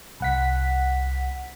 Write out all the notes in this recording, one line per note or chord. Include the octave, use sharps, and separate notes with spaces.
C2 F#5 B6